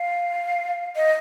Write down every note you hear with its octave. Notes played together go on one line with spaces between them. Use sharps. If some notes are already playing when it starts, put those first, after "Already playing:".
Already playing: F5
D#5